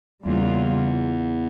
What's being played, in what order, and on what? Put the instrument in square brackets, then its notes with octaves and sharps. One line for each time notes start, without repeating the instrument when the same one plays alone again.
[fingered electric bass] E2 [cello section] C#3 G3 A#3 F4